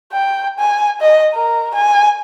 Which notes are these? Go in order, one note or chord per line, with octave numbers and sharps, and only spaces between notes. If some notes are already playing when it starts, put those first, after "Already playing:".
G5
G#5
D#5
A#4
G#5